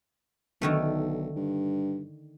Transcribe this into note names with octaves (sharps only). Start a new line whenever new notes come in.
B1 D3 D#3 A3
G2